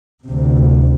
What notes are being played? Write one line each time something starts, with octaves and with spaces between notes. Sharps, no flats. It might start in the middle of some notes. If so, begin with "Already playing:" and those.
D2 C3